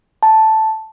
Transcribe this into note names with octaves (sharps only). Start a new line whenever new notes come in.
A5